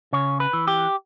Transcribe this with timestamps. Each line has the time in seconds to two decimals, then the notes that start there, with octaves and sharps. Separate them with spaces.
0.13 C#3 C#5
0.40 B4
0.53 E3
0.68 G4